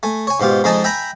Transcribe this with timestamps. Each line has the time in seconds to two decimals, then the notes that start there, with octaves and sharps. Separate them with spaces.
0.03 A3 G#5
0.27 C#5 G#5
0.40 G#2 B2 F4 G4
0.64 F2 G#3 D#4 D#5 G#5 A5
0.84 E5 G5 G#5 A#5 B5